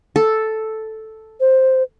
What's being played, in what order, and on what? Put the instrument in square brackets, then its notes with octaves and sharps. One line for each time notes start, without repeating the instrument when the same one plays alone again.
[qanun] A4
[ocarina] C5